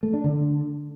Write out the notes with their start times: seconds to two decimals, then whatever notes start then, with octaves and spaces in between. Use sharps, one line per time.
0.03 A3
0.13 D4
0.24 D3